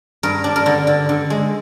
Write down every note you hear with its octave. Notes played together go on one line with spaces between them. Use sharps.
G2 A#4
D4
A#4
D3
D3
D3
G#3